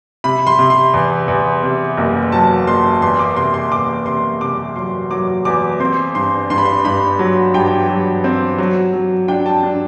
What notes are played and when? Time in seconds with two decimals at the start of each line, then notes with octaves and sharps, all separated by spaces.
0.24 C3 B5
0.47 C6
0.59 C3
0.70 C6
0.93 E2
1.28 E2
1.63 C3
1.97 F#1
2.32 F#3 A5
2.67 F#1 C6
3.02 E2 C6
3.19 D6
3.36 C3 C6
3.54 C6
3.71 E2 D6
4.06 C3 C6
4.41 C3 D6
4.76 F#3 C6
5.11 F#3 D6
5.45 E2 D6
5.80 C4 C6
6.15 G2 C6
6.50 G2 C6
6.58 B5
6.65 C6
6.84 G2 B5
7.19 F#3
7.54 G2 G5
7.89 F#3
8.24 C4
8.58 F#3
8.93 F#3
9.28 D4 G5
9.46 A5
9.63 D4